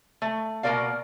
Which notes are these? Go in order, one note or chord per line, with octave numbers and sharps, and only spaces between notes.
A3
B2 A#3 B3 A#4 D5 F5